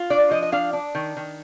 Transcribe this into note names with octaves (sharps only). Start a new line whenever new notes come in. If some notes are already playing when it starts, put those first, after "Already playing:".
Already playing: F4
D4 D5
F3 D#5
D#5
D4 F5
D4
D#3
D#3